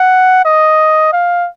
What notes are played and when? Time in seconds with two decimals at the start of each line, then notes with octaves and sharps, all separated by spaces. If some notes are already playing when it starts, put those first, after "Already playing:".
Already playing: F#5
0.45 D#5
1.13 F5